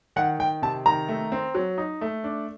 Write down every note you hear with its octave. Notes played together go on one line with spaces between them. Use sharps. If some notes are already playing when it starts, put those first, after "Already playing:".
D#3 F#5
D#3 G5
C3 A5
D#3 A#5
A3
C4
F#3
D#4
A3
D4